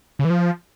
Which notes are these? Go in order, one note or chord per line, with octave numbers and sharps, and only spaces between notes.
C#3
E3
F3